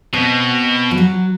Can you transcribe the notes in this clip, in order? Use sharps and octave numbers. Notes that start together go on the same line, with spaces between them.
B2 C4
F3
F#3